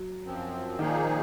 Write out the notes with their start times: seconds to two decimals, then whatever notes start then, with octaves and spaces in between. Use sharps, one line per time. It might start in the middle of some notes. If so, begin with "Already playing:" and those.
Already playing: F#3
0.23 F#2 F3 C4
0.79 A#2 D#3 F3 A#3 D#4 G#4